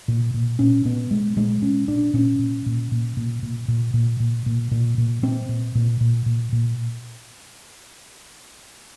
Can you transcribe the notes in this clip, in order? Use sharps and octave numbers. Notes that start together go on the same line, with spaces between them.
A#2
A#2
A#2 C#4
A#2 B3
A#2 G#3
A#2 G#3
A#2 C#4
A#2 D4
A#2 C#4
A#2
A#2
A#2
A#2
A#2
A#2
A#2
A#2
A#2
A#2
A#2
A#2 C4
A#2
A#2
A#2
A#2
A#2